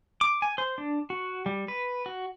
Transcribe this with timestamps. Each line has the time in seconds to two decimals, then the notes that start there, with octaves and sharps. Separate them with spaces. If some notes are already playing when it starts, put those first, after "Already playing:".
0.21 D6
0.42 G#5
0.58 C5
0.78 D4
1.10 F#4
1.46 G3
1.68 B4
2.06 F#4